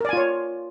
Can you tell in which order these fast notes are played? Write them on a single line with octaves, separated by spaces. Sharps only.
A#4 D5 G#5 F4 C#5